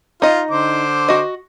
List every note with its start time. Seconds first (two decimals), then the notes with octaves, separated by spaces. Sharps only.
0.22 D#4 F4 D#5
0.51 D3 C5 D6
1.08 F#4 D#5